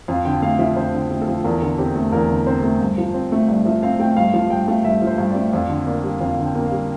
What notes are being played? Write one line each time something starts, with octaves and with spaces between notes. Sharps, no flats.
F2 F5
D3 G5
A3 F5
F3 E5
F2 C5
D3
A3
A4
F3
E2 A#4
D3 A4
C4 G4
A3 A4
E2 A#4
D3
C4 C5
A3
G2
F3
C4
A3
G2 D5
F3 E5
C4 F5
A3 G5
G2 F5
F3 F5
G2 G5
A3 F5
G2 E5
F3
C5
G2
A3 D5
F2 D5
D3
A#3 D5
G3
F2 F5
D3
G5
A#3
F5
G3